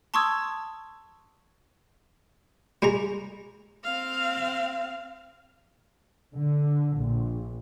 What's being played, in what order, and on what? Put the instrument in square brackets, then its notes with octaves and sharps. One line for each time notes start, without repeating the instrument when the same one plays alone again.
[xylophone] A5 C6 C#6 D#6 E6 G#6
[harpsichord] G3 G#3 A#5
[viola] C4 F5
[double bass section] D3
A#1